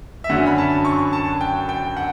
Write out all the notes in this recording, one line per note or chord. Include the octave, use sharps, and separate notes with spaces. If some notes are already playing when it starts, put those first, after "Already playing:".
E5
F#2 D3 F#3 C#4 F#5
B5
A5
C#6
A5
G5
G5
F#5